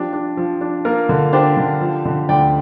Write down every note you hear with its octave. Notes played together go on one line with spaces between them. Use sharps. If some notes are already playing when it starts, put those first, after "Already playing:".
Already playing: F3 D4 G4
D4
F3
D4
A#3 F4 A#4
D3
D4 G4 C5
D3
F3
D3
D2 D5 G5